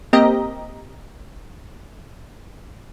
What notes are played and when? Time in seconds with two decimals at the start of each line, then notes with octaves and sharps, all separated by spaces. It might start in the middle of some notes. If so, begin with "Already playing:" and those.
0.13 A#3 C4 G4 D#5 A#5